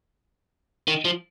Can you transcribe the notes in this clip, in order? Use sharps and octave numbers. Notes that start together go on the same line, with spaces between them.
D#3
F3